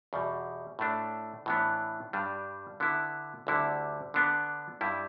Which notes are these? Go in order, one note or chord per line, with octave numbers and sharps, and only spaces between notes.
E2 B2 G3
A2 A3 D4
A2 E3 B3 D4
G2 G3 D4
D3 B3 E4
D2 D3 G3 E4
D3 B3 D4
G2 G3 E4